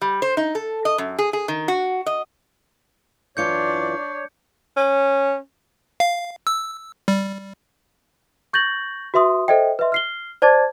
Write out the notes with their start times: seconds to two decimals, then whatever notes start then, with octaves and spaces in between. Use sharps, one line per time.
0.01 G3
0.22 C5
0.37 D#4
0.55 A4
0.85 D#5
0.98 F#2
1.19 G#4
1.33 G#4
1.48 D#3
1.68 F#4
2.06 D#5
3.37 F#2 E3 D4 F4 C#5 D5 G6 C#7
4.77 C#4
6.00 F5
6.47 E6
7.08 G3
8.53 C#6 G6 A6 A#6 F#7
9.14 F#4 B4 E5 C6 D#6
9.48 A4 C5 D#5 E5 G5
9.79 B4 D#5 E5 C6
9.92 F6 C7 G7
10.42 C5 D5 A5 D6 G#6 A6